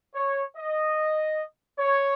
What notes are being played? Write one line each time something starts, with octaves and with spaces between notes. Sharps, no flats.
C#5
D#5
C#5